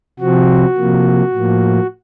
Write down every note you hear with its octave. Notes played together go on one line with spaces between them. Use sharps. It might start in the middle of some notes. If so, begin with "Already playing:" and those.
C3 F3 C4 F#4
C3 F3 A#3
A2 F3 A#3